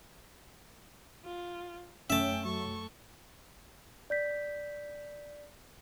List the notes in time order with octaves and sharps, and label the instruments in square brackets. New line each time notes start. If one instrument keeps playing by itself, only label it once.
[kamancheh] F4
[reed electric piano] F#2 A3 [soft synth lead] C#4 [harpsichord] E5 A5 [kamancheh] G5
[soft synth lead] F#3 [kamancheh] A4 C#6
[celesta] D5 G6 B6